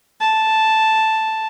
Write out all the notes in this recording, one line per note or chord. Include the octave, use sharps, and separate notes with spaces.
A5